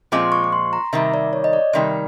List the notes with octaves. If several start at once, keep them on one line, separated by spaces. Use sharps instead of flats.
A#2 F3 G#3 C4 D6
C#6
C#6
C6
A#5
C3 D#3 G3 E5
D5
C#5
D#5
D5
C3 D#3 G3